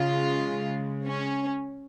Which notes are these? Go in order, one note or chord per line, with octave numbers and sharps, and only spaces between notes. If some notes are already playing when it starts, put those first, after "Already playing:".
Already playing: C#3 G#3 F4
C#4